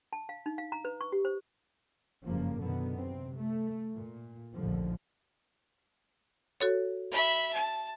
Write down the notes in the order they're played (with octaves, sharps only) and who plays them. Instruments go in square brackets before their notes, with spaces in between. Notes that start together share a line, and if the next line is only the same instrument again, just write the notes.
[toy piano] A5
F5
D#4
F5
A#5
B4
C#6
G4
C5
[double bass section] F#1 G2 C#3 F3 A#3
F#2 B2 D3 D#3 B3
C3 C4
A3
A#2
A#1 D#2 A2 D3 F3
[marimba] F#4 A4 C#5
[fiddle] E5 B5
A5